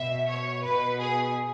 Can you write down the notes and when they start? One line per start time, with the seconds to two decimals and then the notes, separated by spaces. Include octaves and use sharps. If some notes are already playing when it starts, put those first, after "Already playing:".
Already playing: B2 E5
0.29 C#5
0.64 B2 B4
1.00 G#4